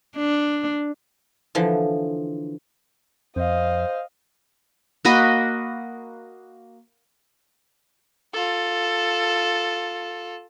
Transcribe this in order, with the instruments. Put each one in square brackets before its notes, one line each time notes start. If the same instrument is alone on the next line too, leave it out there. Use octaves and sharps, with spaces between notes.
[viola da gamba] D4
[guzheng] D3 E3 F3
[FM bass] F2 [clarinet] C5 [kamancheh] D#5 F5
[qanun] A#3 F#4 D#5 B5
[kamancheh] F4 A4